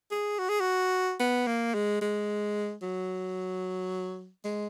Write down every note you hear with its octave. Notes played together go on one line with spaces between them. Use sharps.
G#4
F#4
G#4
F#4
B3
A#3
G#3
G#3
F#3
G#3